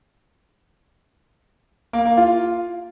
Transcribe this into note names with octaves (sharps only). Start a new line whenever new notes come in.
A#3
A#3
F4